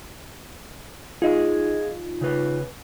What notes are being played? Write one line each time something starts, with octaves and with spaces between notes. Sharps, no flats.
D#4 F4 G#4 D#5
C#3 B4